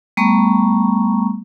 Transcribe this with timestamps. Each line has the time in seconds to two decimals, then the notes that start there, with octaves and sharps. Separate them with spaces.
0.17 G3 A3 B3 A#5 C#6